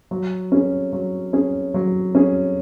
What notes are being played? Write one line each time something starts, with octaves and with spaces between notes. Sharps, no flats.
F#3
C#4 G#4
F#3
C#4 G#4
F#3
C#4 G#4